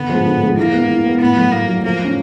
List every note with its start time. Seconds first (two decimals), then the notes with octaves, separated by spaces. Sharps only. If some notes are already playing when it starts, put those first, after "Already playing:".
Already playing: D3 B3
0.09 F3 G#3
0.26 D3
0.42 F3 G#3
0.57 E3 A#3
0.72 G#3 B3
0.89 E3
1.05 G#3 B3
1.21 A2 B3
1.36 F#3 A3
1.52 A2 A#3
1.68 F#3 A3
1.83 F3 A#3
2.00 A3 C#4